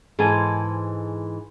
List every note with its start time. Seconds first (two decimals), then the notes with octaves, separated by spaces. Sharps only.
0.19 G#2 E3 G#3 A4 G#5